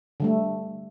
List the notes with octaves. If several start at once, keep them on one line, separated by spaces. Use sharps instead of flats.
D3 G3 A3